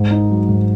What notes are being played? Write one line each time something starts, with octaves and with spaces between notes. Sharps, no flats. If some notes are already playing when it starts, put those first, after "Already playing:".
Already playing: G#2
D#4
F#3
G#2